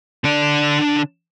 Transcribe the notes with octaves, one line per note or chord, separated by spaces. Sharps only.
D3 D4